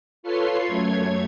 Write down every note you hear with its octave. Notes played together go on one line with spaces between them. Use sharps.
F4 A4 B4 C#5 C6 C7
F#2 A3 C#5 G#6